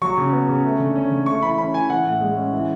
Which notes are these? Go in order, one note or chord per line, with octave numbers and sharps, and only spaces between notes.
F#3 C#6
C#3
B3
C#3
A3
D3
C#4
D3
A3 C#6
E3 B5
C#4 B5
E3 G#5
E3 F#5
A2
G#3
C#4
E3